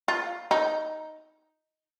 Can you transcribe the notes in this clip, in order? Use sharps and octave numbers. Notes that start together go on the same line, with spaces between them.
F4
D#4